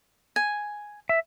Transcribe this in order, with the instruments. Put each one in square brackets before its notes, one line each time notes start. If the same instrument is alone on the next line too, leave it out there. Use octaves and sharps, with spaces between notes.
[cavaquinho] G#5
[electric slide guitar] E5